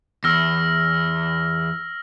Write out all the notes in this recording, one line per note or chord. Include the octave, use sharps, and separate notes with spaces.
E2 E6 F6 A#6